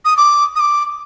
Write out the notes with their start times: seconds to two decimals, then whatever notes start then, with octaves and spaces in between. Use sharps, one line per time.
0.05 D#6
0.17 D6
0.56 D#6
0.60 D6